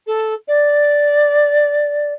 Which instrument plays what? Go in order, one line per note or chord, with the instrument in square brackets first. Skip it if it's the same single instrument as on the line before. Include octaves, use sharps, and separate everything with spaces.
[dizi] A4
D5